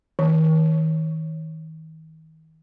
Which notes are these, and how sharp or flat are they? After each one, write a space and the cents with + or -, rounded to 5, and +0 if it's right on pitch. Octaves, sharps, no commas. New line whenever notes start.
D#3 +40